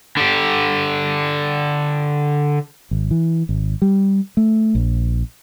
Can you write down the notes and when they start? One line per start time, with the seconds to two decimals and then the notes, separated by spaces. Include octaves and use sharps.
0.17 D3 G4
2.91 G#1
3.11 E3
3.49 G#1
3.82 G3
4.37 A3
4.75 A#1